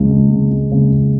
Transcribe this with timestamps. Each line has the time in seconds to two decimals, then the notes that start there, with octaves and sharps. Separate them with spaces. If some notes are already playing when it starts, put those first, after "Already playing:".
Already playing: C#2 C#3 G#3
0.10 C#2
0.30 C#3 G#3
0.51 C#2
0.71 C#3 G#3
0.92 C#2